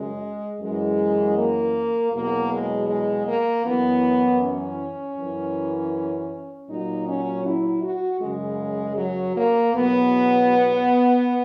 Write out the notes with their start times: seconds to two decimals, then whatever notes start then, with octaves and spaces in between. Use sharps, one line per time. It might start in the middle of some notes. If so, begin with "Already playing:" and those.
Already playing: F#2 C#3 F#3 G#3
0.60 F#2 E3 G#3
1.36 A#3
2.13 E2 B2 F#3 A#3
2.51 G#3
2.89 G#3
3.26 A#3
3.64 F#2 E3 B3
4.41 C#4
5.16 F#2 E3
6.69 A#2 F#3 D#4
7.07 C#4
7.45 E4
7.83 F#4
8.21 F#2 C#3 F#3 G#3
8.97 F#3
9.36 A#3
9.73 E2 B2 F#3 B3